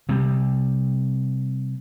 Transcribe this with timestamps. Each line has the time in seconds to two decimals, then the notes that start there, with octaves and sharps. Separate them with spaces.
0.09 C3 G3